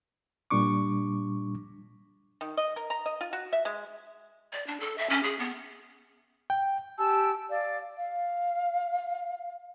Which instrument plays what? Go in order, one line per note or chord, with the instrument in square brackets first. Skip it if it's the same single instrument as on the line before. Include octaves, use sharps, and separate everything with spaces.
[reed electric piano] A#2 G3 D4 C#6 D6
[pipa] D#3
D#5
A#4
A#5
D#5
F4
F#4
E5
G#3
[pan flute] D5
D4
A4
E5
C#4
G#4
B3
[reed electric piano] G5
[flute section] G4 G#5 A5 E6
D5 F5
F5